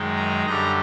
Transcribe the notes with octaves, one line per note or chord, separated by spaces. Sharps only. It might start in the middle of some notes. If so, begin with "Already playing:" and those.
Already playing: F#2 D#3 G#3
A#5
F#2 D3 G3 A#5